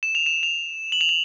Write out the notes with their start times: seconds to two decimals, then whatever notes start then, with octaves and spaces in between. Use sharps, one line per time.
0.03 E7
0.15 F7
0.26 E7
0.43 F7
0.92 F#7
1.01 F7
1.09 F#7